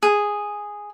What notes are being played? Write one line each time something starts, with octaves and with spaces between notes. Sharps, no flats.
G#4